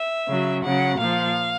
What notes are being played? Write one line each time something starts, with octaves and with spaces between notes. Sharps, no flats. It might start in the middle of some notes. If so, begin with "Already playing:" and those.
Already playing: E5
C#3 F#3
C#3 F#3 F#5
A#2 F3 F5